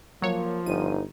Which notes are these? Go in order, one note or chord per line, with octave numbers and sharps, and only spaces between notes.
F3 F#3 A#3 C#5
G1 D#4 D#7